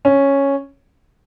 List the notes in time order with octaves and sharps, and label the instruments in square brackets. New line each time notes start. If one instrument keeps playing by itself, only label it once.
[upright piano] C#4